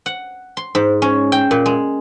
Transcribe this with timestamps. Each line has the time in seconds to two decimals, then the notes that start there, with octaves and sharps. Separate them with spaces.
0.06 F#5
0.57 C6
0.75 G#2
1.02 C#4
1.32 G5
1.51 A#2
1.66 G#3